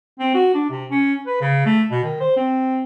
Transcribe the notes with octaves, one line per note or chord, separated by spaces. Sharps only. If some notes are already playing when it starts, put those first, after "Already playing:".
C4
F#4
D4
C3
C#4
B4
C#3
A3
B2
D#3
C5
C4